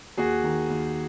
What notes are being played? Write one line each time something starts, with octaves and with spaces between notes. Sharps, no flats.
D#2 F#4 G#4
D#3
D#2